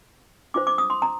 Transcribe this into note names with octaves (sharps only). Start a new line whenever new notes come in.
D4 F4 C5 D6
D6
D#6
C6
A#5